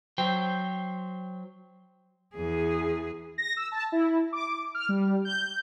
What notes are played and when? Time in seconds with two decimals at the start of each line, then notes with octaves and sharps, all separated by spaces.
0.18 F#3 C5 G5
2.35 E2 G#4
3.38 A#6
3.57 E6
3.72 A5
3.92 E4
4.33 D6
4.75 F6
4.89 G3
5.25 G6